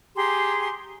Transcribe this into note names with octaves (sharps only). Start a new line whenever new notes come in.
G4 G#4 A#5 C6